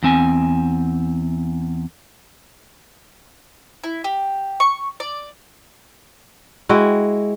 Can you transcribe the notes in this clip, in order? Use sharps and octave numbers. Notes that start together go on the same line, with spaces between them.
E2 C4 G#5
E4
G4
C#6
D5
G#3 E4 F#4 G5